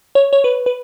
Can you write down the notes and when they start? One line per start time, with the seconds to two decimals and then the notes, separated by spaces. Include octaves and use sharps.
0.15 C#5
0.33 C#5
0.44 B4
0.66 B4